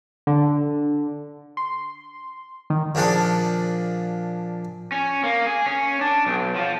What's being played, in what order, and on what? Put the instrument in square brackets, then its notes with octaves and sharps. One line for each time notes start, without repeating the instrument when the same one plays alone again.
[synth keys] D3
C6
D#3
[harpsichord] A#2 F3 D4 G#4
[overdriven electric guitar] C#4
A#3
G#4
C#4
D4
B1
F3